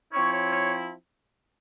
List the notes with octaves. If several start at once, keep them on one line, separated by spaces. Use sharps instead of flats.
F3 C4 E4 C#5
C#5
C#5